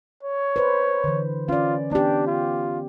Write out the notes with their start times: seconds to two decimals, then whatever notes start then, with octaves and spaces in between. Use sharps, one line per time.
0.23 C#5
0.56 B4 C5
1.04 D3 E3
1.49 C#4 F4 D5
1.91 B3 D4 G4
2.27 F4